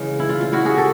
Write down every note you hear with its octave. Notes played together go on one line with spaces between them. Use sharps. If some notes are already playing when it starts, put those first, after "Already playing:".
Already playing: C#3 E3 G#3
E4
F4
F4
E4 F#4
F#4 G#4
G4 A4